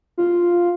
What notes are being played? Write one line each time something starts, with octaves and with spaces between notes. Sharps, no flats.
F4